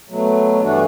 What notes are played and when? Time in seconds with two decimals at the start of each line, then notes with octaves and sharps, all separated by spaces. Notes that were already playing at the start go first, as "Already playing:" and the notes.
0.09 B2 F#3 A3
0.61 G2 E3 A3 D4 F#4